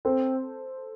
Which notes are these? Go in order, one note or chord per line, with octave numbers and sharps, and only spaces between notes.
C4 A4 C5